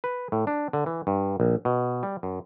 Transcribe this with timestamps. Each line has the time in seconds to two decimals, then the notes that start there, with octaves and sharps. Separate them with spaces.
0.04 B4
0.32 A2
0.47 D4
0.73 D3
0.86 E3
1.07 G2
1.40 A#1
1.65 B2
2.03 G3
2.23 F#2